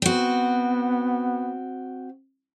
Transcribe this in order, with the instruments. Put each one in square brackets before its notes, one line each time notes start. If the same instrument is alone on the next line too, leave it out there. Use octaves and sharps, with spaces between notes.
[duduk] B3 [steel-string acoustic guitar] C4 F#4